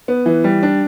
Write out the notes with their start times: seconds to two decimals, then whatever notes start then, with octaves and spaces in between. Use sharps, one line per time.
0.08 B3
0.26 E3
0.44 G3
0.63 D4